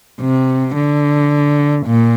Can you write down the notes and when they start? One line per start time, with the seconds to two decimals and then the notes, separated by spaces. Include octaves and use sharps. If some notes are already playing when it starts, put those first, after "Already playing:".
0.20 C3
0.75 D3
1.86 A#2